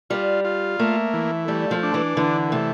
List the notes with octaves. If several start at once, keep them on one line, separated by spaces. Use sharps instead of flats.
G3 F4
F4
A3 A#3
E3
G3 A3
F3
D4
E3
D3 E3
C3 A3